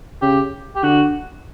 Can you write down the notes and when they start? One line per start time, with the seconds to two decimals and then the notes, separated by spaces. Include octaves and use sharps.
0.22 C#3 G4
0.75 G4
0.83 D3 F#4